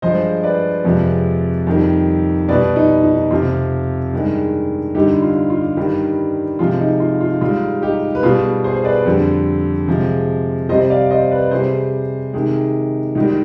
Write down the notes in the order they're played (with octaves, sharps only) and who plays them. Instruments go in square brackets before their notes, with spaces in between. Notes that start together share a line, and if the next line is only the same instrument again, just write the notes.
[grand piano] G2 F3 G#3 C5 D#5
B4 D5
F2 C3 F3 G#3
F2 D#3 G3
B2 B4 D5
G3
D#4
D#4
F2 C3 F3 F4
G2 D#3 G#3
G2 D3 G3 D#4 G4
F4
F4
G2 D#3 G3
C3 F3 G#3 F4
D#4
F4
F4
G#2 G3 F4
D#4 G4
B4
B2 F4 G#4
G3
G#4 C5
B4 D5
F2 D3 G3
C3 F3 G#3
C3 G3 C5 D#5
D5 F5
C5 D#5
B4 D5
C3 G3 G#4 C5
C3 D#3 G#3
G#2 D#3 G3 D#4